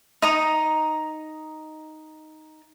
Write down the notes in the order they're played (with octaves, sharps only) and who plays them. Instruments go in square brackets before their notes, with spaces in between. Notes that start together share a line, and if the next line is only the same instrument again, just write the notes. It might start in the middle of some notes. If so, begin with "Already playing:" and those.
[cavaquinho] D#4 A#5 D#6